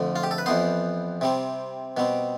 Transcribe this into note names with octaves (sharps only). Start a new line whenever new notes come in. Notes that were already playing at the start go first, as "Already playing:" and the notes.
Already playing: F2 D3 F3 A3
F4
G4
A4
B4
F2 E3 B3 C5
C3 G3 C4
B2 G3 C4